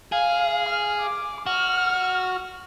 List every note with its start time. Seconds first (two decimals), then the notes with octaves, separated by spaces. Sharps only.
0.12 G#4 F5
0.68 F6
1.00 D6
1.46 F#4 F6